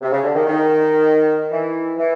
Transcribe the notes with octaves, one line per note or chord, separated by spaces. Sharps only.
C3
C#3
D3
D#3
D#3
E3
E3